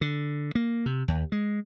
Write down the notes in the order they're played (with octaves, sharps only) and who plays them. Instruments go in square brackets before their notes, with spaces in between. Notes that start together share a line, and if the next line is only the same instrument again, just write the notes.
[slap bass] D3
A#3
C3
D#2
G#3